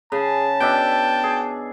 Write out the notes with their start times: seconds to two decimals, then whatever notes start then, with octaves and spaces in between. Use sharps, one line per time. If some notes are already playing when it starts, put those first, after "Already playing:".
0.12 C#3 G#4 A5
0.61 B2 D4 E5 G5
1.24 G#4